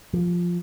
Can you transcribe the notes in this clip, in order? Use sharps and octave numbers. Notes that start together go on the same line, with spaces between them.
F3